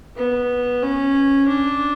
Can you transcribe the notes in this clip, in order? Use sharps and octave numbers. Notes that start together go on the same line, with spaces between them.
B3
C#4
D4